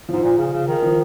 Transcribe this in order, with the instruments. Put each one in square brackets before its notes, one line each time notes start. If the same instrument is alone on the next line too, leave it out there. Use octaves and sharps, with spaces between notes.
[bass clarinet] G#2 [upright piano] F3
[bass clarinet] A#2
C#3
C#3
D#3
[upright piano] F3